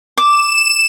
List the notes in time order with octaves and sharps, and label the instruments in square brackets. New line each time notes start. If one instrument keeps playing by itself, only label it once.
[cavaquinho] D6 [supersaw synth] E7